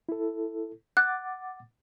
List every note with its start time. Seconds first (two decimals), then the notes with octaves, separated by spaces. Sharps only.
0.09 E4 A4
0.97 F#5 D6 F#6 A6